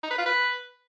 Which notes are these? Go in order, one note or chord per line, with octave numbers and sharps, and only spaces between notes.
D#4
B4
F4
B4